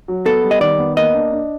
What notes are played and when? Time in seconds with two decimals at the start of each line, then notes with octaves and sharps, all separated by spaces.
0.08 F#3
0.26 B3 A4
0.43 G3
0.51 D#5
0.61 D#3 D5
0.79 B3
0.97 A#3 D#5
1.14 D4
1.32 D4